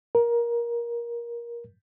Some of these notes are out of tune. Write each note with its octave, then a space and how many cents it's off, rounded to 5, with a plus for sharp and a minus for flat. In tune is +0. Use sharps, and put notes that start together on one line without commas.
A#4 +20